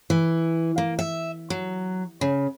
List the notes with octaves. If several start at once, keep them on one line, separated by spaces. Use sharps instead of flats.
E3
A#3
E5
F#3
C#3